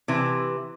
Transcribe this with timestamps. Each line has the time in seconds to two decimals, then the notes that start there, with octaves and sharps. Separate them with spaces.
0.08 C3 E3